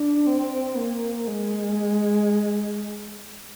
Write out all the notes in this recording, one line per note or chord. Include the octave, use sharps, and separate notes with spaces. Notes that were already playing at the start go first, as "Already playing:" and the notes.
Already playing: D4
C4
A#3
G#3